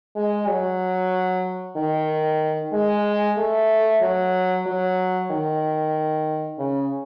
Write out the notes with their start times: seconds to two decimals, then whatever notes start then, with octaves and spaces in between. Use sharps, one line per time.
0.16 G#3
0.47 F#3
1.76 D#3
2.73 G#3
3.37 A3
4.01 F#3
4.66 F#3
5.31 D#3
6.59 C#3